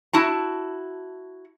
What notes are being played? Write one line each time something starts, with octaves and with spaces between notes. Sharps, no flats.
E4 F#4 A5